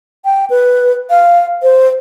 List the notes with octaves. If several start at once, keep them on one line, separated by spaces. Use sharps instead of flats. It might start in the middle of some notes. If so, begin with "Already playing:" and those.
G5
B4
F5
C5